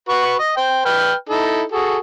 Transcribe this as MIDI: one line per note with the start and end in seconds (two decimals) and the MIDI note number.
0.09 0.36 66
0.09 0.36 71
0.09 0.36 85
0.39 0.52 75
0.57 0.82 72
0.57 0.82 79
0.85 1.14 71
0.85 1.14 79
0.85 1.14 89
1.29 1.63 63
1.29 1.63 64
1.29 1.63 69
1.72 1.98 66
1.72 1.98 68
1.72 1.98 69